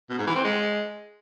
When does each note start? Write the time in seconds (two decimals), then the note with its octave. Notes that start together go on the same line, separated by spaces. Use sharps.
0.10 B2
0.18 G#2
0.27 E3
0.36 C4
0.44 G#3